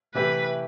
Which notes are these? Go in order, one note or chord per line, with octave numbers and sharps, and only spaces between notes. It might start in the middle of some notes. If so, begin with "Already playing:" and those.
C3 E3 A3 E4 G4 B4